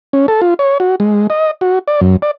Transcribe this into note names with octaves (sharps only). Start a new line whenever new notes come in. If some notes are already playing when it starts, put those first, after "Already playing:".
C#4
A4
F4
C#5
F#4
G#3
D#5
F#4
D5
F#2
D5